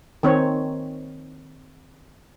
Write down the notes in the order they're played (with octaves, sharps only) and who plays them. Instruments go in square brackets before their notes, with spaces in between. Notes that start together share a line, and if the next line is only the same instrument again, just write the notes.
[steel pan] D#3 C4 C#5